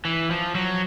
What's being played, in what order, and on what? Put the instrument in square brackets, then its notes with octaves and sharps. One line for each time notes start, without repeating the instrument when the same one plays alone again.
[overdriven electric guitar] E3
F3
F#3